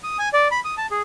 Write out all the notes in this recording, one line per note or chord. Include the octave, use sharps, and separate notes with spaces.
D#6
G#5
D5
B5
D#6
A5
G#4